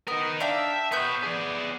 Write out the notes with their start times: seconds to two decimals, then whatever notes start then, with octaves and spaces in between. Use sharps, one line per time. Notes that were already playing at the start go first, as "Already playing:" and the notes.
0.08 B3 D#4 A#4
0.41 D4 E5 F5 G5
0.92 B3 B4 C#5 G6
1.24 G#4 D5